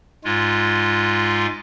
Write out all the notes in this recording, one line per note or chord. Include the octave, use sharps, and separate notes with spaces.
G#2 G#3 F4